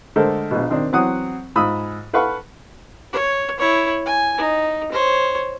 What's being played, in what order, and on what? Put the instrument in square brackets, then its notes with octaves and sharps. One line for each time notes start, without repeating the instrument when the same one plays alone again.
[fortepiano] D3 G#3 A3 A4 A#4 C5
A#1 B2
D#3 C4 D4
E3 F#3 C4 F#5 D#6
G#2 F4 B5 D#6 E6
A4 B4 F5 F#5 B5 C#6
[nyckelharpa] C#5
E4 C#5
G#5
D#4
C5 C#5